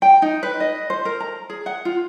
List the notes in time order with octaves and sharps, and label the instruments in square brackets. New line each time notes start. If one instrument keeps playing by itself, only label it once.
[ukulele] G5
D#4
B4
D#5
C5
A#4
A#5
G#4
F#5
F4